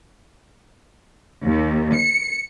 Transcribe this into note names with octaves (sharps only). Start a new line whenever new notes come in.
D#2
C#7